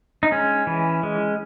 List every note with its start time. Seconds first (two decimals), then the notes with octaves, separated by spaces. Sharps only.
0.23 D#4
0.31 G#3 C#4
0.67 E3
1.03 G#3